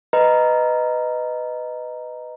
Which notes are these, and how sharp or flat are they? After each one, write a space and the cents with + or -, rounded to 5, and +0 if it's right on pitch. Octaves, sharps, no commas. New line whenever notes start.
B4 +10 D#5 +0 A#5 +0